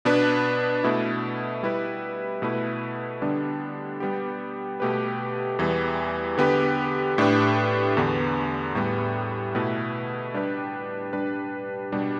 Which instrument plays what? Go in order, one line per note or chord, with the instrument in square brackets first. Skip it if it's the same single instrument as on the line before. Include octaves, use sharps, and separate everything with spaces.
[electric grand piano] B2 B3 D4 B4
B2 A3 E4
G3 E4 B4
B2 A3 E4 B4
D3 G3 B3 D4
G3 B3 G4
B2 A3 G4 B4
E2 E3 G3 B3
D3 B3 G4 B4
A2 A3 D4 G4 B4
E2 D3 B3
A2 G3 B3
B2 A3 E4 B4
G3 D4 G4 B4
G3 D4 B4
B2 G3 D4